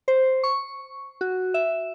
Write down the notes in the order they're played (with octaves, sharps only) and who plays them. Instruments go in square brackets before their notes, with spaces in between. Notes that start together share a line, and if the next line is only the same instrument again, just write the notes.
[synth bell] C5
C#6
F#4
E5